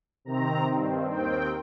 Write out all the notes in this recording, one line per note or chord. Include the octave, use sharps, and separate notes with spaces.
C3 D#3 C4 A#5
G2 D#3 C4
D#2 D#3 C4 G5